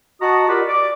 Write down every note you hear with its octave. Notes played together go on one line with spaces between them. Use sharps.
F#4 D#5 F#5 A5 A#5 D#6
F4 G4 A#4 B4 D5 D#5
D5 D6